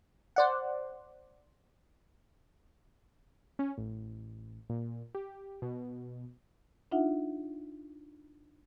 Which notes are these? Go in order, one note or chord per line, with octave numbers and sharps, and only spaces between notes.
C5 D5 F#5
C#4
A1
A#2
G4
B2
D4 D#4 F4 E5 F#5